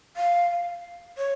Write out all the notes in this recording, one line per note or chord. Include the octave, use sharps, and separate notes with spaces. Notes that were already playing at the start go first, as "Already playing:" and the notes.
F5
C#5